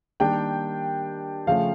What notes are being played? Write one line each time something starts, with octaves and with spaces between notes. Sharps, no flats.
D#3 G3 A#3 D4 G5
C#3 F3 A3 C#4 F5